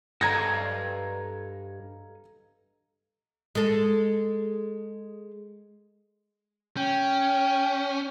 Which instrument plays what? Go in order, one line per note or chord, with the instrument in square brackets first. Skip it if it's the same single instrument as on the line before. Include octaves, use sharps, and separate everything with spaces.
[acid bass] G2 [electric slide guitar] A4 D#5 F5 [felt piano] A#5 G#6 A#6
[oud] G#3 A4
[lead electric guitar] C#4 [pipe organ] G5